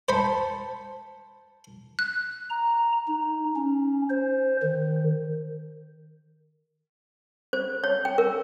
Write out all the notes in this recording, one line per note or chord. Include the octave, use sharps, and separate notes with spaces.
C5 A5 B5 C#7
F#6
A#5
D#4
C#4
C5
D#3
C5
C#5
G5
A#4